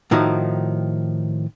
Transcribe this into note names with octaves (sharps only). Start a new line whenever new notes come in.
A2 D#3 F3 D#4 F#4